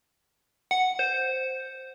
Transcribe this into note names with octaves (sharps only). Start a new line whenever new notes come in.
F#5
C5